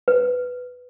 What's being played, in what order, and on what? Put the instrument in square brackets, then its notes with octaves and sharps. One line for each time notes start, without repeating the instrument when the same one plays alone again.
[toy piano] B4